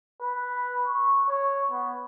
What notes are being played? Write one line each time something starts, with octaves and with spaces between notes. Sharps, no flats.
B4
C#6
C#5
B3